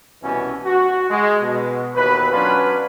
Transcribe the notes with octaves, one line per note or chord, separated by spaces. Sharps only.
C2 B2 E3 C#4
F#4
G#3
B2
D#2 B2 E3 B4
F#3 C#4 D4 F4 B4